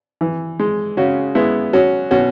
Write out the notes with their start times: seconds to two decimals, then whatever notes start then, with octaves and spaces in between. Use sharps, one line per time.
0.21 E3
0.59 G#3
0.97 C#3 C#4 F#4
1.35 G#3 B3 E4
1.73 F#3 C#4 F#4
2.11 B2 C#4 F#4